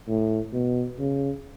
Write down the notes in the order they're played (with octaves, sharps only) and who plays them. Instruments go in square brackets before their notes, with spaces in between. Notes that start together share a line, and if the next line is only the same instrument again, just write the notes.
[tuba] A2
B2
C#3